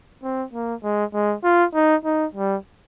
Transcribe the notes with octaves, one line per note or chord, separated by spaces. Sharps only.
C4
A#3
G#3
G#3
F4
D#4
D#4
G3